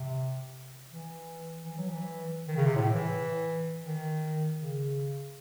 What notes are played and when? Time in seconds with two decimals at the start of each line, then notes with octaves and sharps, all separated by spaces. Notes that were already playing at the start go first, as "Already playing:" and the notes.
Already playing: C3
0.92 E3
1.65 E3
1.78 F#3
1.90 E3
2.48 D#3
2.57 C#3
2.66 C3
2.76 A2
2.94 E3
3.86 D#3
4.60 C#3